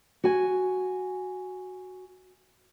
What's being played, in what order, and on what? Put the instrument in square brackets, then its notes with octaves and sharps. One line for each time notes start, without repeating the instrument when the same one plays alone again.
[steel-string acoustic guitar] F#4 G#5